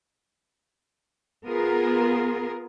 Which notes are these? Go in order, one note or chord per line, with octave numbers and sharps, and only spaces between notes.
B3 F4 G#4 A#4